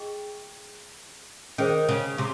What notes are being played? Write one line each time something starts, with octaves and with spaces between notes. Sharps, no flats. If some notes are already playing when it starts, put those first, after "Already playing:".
Already playing: G#4 D#5 G5 C#6
D#3 C#4 G#4 C5
C#3
C3